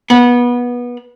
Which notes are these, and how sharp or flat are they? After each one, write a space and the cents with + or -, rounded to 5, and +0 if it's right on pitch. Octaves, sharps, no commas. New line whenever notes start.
B3 -20